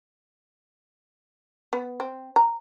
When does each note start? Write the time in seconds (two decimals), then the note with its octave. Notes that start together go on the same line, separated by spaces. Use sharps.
1.73 B3
2.00 C4
2.36 A#5